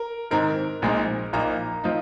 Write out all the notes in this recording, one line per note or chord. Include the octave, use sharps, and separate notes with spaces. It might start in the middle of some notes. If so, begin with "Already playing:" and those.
Already playing: A#4
G#2 D#3 C4 D#4 A#4
A#1 A#2 G#3 C4 D#4
A#1 A#2 A#3 D#4 A#5
F3 C4 D#4